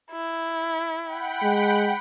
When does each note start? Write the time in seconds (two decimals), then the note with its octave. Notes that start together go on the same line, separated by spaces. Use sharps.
0.11 E4
1.02 F#5 G5 B5
1.42 G#3